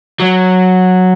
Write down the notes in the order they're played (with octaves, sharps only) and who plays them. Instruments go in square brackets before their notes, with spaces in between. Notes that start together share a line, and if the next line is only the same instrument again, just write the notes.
[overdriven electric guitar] F#3